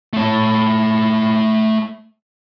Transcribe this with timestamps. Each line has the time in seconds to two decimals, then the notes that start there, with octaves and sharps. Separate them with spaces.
0.13 A3 C#5